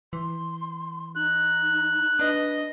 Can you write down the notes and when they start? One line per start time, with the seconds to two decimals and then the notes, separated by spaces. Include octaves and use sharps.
0.13 E3 C6
1.16 D#4 F#6
2.19 D4 B4 D#5